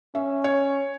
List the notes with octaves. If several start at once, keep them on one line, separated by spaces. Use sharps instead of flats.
C#4 E5
C#5